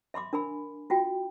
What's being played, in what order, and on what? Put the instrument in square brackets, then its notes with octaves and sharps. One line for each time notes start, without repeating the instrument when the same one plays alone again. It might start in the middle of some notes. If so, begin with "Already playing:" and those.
[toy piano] E5 B5 C6 D6
D4 A#4 G#5 B5
F4 F#4 G5